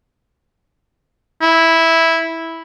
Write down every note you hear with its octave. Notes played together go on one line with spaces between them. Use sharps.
E4